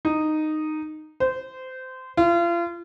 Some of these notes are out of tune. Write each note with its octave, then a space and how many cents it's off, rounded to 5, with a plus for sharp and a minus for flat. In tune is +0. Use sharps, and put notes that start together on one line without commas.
D#4 -10
C5 -20
F4 -35